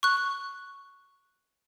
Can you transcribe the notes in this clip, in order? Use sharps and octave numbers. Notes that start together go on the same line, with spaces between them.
C#6 F#6